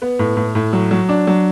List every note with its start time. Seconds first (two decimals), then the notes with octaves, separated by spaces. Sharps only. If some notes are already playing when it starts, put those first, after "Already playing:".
0.02 B3
0.19 A2
0.37 A2
0.55 A2
0.73 F#3
0.91 F#3
1.09 D4
1.27 F#3